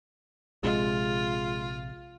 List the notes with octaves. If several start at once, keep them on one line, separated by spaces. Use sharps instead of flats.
A#1 C3 G#3 F4